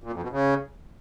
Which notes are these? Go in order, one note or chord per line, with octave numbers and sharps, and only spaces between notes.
A#2
F2
B2
C#3